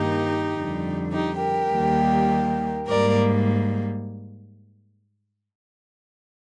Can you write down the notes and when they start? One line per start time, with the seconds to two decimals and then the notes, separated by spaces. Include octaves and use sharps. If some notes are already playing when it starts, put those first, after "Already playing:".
Already playing: G2 D#3 A#3 D#4 G4
0.54 F2 D3 G3
1.13 D#4 G4
1.42 G4 A#4
1.72 D#2 D#3 G3 A#3
2.88 G#2 G3 A#3 A#4 D5